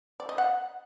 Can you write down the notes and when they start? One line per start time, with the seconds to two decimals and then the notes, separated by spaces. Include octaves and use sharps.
0.20 D5
0.29 D#5
0.38 F#5